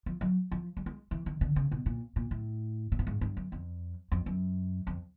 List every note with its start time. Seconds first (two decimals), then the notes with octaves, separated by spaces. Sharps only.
0.06 F3
0.21 F#3
0.52 F3
0.77 G3
0.86 G#3
1.11 E3
1.26 D#3
1.41 D3
1.56 C#3
1.72 B2
1.86 A#2
2.16 A#2
2.31 A2
2.92 A#2
2.99 A2
3.07 G#2
3.21 G2
3.37 F#2
3.52 F2
4.12 F2
4.26 F#2
4.87 F2